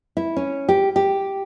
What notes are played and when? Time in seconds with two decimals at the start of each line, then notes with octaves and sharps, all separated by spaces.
0.17 E4
0.36 C#4
0.69 G4
0.96 G4